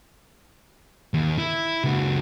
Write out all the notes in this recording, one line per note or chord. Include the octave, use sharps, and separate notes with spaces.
D#2
E4
C#2 F#4